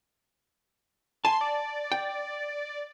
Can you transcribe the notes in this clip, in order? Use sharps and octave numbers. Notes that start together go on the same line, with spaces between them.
G#5 A5 C6
D5
G5